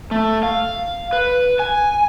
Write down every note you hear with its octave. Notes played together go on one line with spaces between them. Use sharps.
A3
F5
B4
G#5